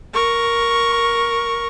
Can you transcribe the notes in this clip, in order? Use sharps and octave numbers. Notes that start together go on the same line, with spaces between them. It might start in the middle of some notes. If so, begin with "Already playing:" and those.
A#4 C#6